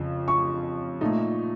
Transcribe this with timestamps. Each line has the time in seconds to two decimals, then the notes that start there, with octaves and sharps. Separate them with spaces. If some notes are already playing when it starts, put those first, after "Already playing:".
Already playing: F2 C#3 F3
0.28 C#6
1.01 A#2 A3 D#4